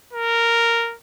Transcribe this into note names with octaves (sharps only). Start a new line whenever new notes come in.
A#4